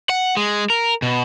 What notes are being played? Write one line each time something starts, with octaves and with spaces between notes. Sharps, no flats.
F#5
G#3
A#4
B2